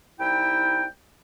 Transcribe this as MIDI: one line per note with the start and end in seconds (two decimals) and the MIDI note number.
0.19 0.86 36
0.19 0.86 63
0.19 0.86 64
0.19 0.86 79